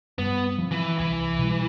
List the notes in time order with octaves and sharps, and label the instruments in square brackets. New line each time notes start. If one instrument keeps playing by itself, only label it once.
[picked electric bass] G2 [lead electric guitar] B3
[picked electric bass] F3 C4
[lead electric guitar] E3
[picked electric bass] C2 [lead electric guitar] E3
[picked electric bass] B2 G3